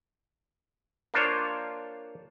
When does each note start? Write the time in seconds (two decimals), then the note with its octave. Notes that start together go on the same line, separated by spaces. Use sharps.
1.14 A#3 D4 F4 C5 C#5